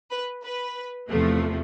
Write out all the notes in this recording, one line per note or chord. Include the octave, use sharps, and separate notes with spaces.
B4
B4
E2 C3 F3 A3